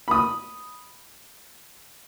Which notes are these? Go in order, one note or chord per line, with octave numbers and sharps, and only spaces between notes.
B5 D#6